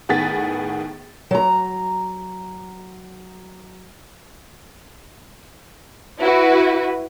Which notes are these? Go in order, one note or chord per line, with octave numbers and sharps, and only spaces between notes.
A2 D#3 B3 G#4 A6 B6
F#3 A#5
E4 F#4 B4